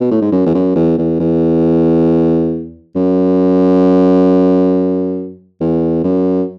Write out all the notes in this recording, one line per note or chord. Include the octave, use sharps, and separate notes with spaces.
B2
A2
G#2
F#2
E2
F#2
E2
E2
E2
F#2
E2
F#2